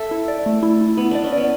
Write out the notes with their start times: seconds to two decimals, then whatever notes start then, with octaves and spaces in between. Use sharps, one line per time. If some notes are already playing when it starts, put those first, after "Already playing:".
Already playing: A4 E5
0.11 E4
0.28 D5
0.46 A3
0.63 E4
0.81 E4
0.97 B3 E4
1.11 D4 D5
1.24 C#4
1.33 B3 D5